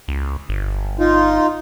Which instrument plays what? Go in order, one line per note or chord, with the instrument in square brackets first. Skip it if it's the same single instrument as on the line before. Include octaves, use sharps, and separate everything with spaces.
[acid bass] C#2
G1
[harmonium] D#4 F4